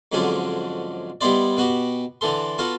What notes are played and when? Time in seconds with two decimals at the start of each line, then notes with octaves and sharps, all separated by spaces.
0.12 F2 G#2 D3 F#3 C#4 D4
1.21 G3 B3 D#4 E4 C5 D5
1.57 B2 B3 F#4 G4
2.21 D3 E3 A4 C6
2.58 B3 F4 F#4 A4